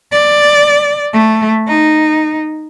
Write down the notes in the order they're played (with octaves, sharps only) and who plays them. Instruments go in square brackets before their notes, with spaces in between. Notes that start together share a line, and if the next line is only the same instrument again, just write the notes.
[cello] D5
A3
D#4